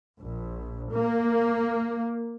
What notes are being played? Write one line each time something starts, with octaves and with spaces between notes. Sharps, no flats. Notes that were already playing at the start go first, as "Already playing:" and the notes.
A#1
A#3